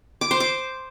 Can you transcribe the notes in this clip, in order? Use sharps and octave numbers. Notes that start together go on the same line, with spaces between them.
D6
C5
D6